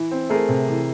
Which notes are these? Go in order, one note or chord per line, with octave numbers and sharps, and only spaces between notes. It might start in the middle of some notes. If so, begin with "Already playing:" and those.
Already playing: E3 E4
C4
A3 G#4 A#4
C3
E3